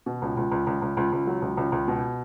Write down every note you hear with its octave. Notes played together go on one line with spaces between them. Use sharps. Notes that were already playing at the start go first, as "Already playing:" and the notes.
B2
C#2
C#2
C#2
C#2
C#2
C#2
C#2
F#3
C#2
C#2
C#2
B2